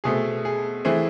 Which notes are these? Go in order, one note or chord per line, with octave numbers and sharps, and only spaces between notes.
B2 A3 C4 G#4
G#4
E3 A3 C4 G#4